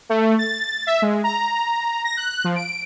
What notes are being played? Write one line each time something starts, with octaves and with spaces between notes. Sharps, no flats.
A3
A6
E5
G#3
A#5
A#6
F#6
F3
D7